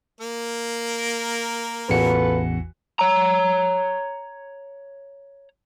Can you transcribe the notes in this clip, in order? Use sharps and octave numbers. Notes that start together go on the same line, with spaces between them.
A#3 A#4
A1 E2 E3 F4 F#4 A4 B4 C#7
C#5 A#5